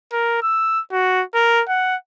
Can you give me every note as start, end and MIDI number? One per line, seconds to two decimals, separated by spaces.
0.13 0.39 70
0.43 0.80 88
0.92 1.23 66
1.34 1.62 70
1.69 1.96 78